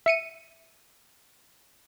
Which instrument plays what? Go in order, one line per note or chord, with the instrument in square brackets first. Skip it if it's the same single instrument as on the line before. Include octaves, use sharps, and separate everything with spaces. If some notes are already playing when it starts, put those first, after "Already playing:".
[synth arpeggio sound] E5 C#7 D#7